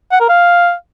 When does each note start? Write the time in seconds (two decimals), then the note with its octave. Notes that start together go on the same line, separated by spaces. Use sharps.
0.12 F#5
0.20 A#4
0.29 F5